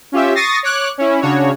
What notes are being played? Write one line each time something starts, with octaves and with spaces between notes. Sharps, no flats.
C#4 F4 G4 E5
C#6 D#6 A6 A#6 C7
C#5 D6 F#6
C#4 E4
C#3 D4 F#4 C#5